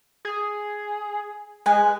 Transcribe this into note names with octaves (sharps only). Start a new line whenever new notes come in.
G#4
G#3 B4 G#5